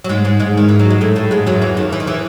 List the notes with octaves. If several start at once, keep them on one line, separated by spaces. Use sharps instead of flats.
F#3
G#2 G#3
G#2 G#3
G#2 G#3
D#3
E3
F#3
G#3
A2 A3
A2 A3
G#2 G#3
F#2 F#3
E2 E3
D#2 D#3
E3
D#3
E3